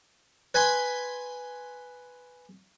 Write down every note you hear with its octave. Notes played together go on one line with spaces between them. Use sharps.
B4 G#5 B5 C6